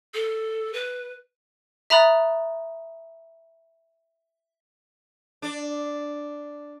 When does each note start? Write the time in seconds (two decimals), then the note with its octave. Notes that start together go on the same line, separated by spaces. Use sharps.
0.14 A4
0.73 B4
1.90 E5 A#5 B5 D#6 F#6 A6
5.42 D4